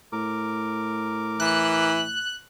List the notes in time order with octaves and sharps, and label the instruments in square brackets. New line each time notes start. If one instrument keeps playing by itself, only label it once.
[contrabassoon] A2 [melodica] A#4 D6
[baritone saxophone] E3 [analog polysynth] F#6